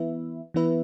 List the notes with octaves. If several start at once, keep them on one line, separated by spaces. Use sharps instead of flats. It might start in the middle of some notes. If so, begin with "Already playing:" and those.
Already playing: E3 B3 E4 B4 E5
E3 B3 E4 B4 E5